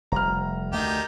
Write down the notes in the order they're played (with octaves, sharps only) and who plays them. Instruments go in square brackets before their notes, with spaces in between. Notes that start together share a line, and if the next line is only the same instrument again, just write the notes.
[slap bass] F1 G3 [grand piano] A#5 F6
[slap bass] D2 A3 [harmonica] D#3 G4 G5